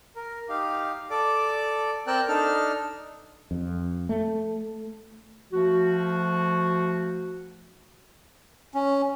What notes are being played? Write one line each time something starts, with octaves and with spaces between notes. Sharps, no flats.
A#4
D#4 G4 F5
A4 D5 D6
C4 A#4 D5 G5 E6 F#6
D4 D#4 A4 F6
F2
A3
F3 A3 F#4
C#4